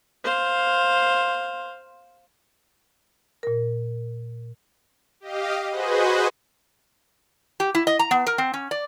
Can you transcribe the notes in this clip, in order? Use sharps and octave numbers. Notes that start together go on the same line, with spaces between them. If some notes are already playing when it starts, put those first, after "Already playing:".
C5 F5
A#2 A#4
G4 D#5 F5
F#4 G#4 B4 C5 D#5
G4
E4
D#5
A#5
B3
A#4
C4
C#4
D5